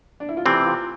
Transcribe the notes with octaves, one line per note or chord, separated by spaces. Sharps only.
D4
E4
F4
C3 E3 A3 C4 G4
F4